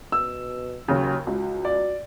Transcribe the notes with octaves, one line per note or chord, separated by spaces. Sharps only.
B2 E6
D#2 C#3 F#3
C#2 F#4
D5